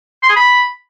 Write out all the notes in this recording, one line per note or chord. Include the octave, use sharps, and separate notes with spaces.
C6
G#4
B5